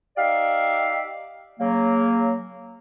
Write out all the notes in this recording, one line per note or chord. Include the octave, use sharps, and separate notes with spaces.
D#4 G4 D5 E5 F5
C#3 F#3 A#3